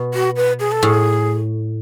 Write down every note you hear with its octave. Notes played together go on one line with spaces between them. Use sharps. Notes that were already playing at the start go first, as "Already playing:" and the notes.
Already playing: B2
F#4
B4
G#4
A4
A2 G#4